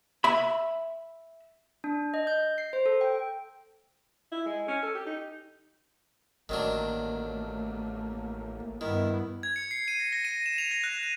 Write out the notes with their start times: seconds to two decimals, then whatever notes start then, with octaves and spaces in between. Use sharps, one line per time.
0.24 E5 B5
1.84 D4
2.14 D#5
2.27 G6
2.58 C7
2.73 C5
2.86 A4
3.01 G5
4.32 E4
4.45 G#3
4.68 C#4
4.82 A4
4.95 G4
5.06 D#4
6.49 A1 D#3 F#3 A3 A#3 D4
8.81 G2 D#3 B3 E4
9.43 G#6
9.56 C#7
9.71 C7
9.88 D#7
9.99 A#6
10.13 A#6
10.25 D#7
10.46 E7
10.58 F7
10.71 A#6
10.84 F#6
11.03 D#7